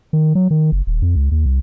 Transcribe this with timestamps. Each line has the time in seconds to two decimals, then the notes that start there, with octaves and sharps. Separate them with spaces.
0.13 D#3
0.35 F#3
0.51 D#3
0.72 F#1
0.87 D#1
1.02 F2
1.16 C#2
1.31 D#2
1.46 C2